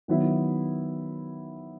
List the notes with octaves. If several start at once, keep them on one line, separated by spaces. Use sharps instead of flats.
D#3 F#3 B3 E4